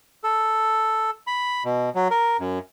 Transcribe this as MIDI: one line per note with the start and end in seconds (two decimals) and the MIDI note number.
0.24 1.11 69
1.27 1.63 83
1.65 1.90 47
1.95 2.08 54
2.11 2.37 70
2.40 2.59 42